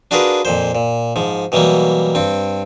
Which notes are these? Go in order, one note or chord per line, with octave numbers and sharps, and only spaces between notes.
D4 F4 F#4 G#4 A#4 B4
F2 A#2 C5
A#2
G#2 F3
B2 E3 F#3 G3 A#3
G2 C4